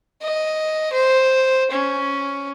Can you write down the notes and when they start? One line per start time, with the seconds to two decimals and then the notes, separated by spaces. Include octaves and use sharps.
0.22 D#5
0.92 C5
1.71 C#4